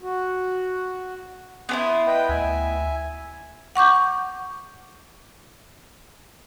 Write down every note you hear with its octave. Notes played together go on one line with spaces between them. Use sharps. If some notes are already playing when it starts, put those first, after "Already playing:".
F#4
B3 D4 E4 C6 D#6
B4 D#5 G5
D2 E5 G#5
F#5 C#6 D6 G6